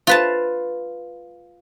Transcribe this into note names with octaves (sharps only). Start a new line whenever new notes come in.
F4 B4 A5